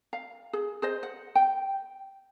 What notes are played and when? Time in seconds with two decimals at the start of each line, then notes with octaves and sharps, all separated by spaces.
0.13 F5
0.53 G#4
0.82 G#4 C5 D#5
1.03 F#5
1.35 G5